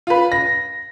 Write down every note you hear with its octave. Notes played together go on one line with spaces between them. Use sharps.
F4 B4
A#6